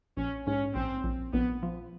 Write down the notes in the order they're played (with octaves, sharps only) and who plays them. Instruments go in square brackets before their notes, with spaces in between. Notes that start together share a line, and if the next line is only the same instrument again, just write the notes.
[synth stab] A#1 [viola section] C#4
[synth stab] G#2 [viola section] C#4
[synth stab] A#1 [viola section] C4
[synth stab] A#1
[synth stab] A#1 [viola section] B3
[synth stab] F3